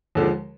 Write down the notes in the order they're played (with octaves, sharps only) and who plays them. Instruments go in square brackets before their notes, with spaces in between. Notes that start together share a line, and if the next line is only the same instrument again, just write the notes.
[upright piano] D#2 D3 F3 G#3